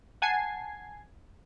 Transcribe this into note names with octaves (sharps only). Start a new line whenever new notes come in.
F#5 G#5 A5 G#6 C7